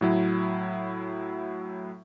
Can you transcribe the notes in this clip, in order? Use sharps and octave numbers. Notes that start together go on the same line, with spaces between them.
A2 F#3 E4